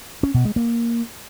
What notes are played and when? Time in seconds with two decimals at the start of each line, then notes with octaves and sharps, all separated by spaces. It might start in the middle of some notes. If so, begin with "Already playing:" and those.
0.23 C#4
0.34 B2
0.45 G#3
0.56 A#3